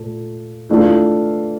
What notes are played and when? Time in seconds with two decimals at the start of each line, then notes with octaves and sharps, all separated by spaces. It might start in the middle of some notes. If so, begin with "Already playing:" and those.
Already playing: A#2 A3
0.69 E3 A3 D4 F4